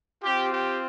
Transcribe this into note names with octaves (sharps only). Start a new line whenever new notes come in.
C4 F4 G4
G4